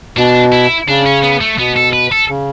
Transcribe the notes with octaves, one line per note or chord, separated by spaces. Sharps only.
B2 D4
E4
C#3 D4
C#4
B3
A3
B2 B3
A4
B4
A4
C#3